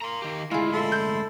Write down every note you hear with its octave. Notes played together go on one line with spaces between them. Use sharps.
A#3 A#5 C6
D#3 G4
D2 G#3 E4 F4 G#4
E4 A4 B5 C6
G6